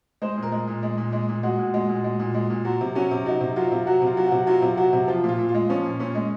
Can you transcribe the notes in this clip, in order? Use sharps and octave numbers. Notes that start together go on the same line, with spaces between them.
G#3 C5
A#2
A#4
G#3
A#2
G#3
A#2
G#3
A#2
G#3 F#4
A#2
G#3
A#2
G#3
A#2
G#3
A#2
F#3
C3
F#3 C#4
C3
F#3 D#4
C3
F#3 F4
C3
F#3 F#4
C3 F4
F#3
F#4
C3
F#3 F4
C3
F#3 F#4
C3
F3 F4
A#2 F4
A#2
F4
G#3
F3 C#4
A#2
A#2 C#4
G#3